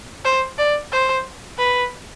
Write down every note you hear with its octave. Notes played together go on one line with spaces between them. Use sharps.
C5
D5
C5
B4